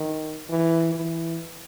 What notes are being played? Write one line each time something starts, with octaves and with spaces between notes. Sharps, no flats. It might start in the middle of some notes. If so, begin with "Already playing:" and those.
Already playing: D#3
E3
E3